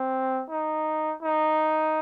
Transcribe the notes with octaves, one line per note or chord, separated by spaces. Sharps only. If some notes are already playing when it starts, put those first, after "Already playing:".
Already playing: C4
D#4
D#4